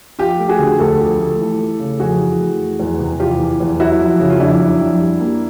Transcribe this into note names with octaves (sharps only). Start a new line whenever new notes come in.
F3 F4 G4
A3
F#4 G#4
D3
D2 G4 A4
F3
A3
E3
A3
C#3
F2 F#4 G#4
E3
A3
E3
E2
C3
E2 F4 G4
E3
E2
F#3 E4 F#4
F2
C#3
F4
F2 D4 E4
F#3
F2
G3
A#3